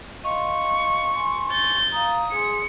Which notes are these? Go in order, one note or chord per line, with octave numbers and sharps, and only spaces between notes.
D#5 F5 C6 C#6
G#5 C6
G6 A6
F5 A#5 D#6
G#4 G#5 C6 C#7